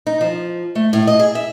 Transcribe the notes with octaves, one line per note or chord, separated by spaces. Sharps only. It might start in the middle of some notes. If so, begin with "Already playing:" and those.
D#4
F3
A3
A2
D#5
G#4
E5